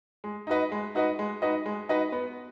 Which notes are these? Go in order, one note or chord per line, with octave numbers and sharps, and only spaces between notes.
G#3
D#4 F#4 B4 D#5
G#3
D#4 F#4 B4 D#5
G#3
D#4 F#4 B4 D#5
G#3
D#4 F#4 B4 D#5
B3